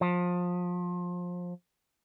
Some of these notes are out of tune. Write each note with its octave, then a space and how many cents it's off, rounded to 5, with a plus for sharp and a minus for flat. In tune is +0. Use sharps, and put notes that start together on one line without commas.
F3 +25